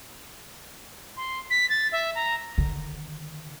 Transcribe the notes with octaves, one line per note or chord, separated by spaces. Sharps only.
C6
B6
A6
E5
A#5
D3 D#3